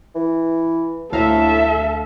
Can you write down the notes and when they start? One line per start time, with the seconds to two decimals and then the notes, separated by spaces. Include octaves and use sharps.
0.15 E3
1.12 D2 A2 A4 E5 F5 A#5